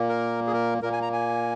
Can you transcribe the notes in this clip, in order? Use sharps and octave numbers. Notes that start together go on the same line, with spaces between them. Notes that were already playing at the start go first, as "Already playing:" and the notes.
Already playing: A#2 A#3
A#4
G#4
A#4
A#2 A#3 A#4
G#5
A#5
G#5